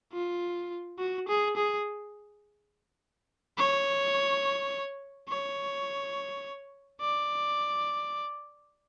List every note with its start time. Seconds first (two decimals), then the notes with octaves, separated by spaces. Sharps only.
0.13 F4
0.99 F#4
1.28 G#4
1.56 G#4
3.58 C#5
5.29 C#5
7.01 D5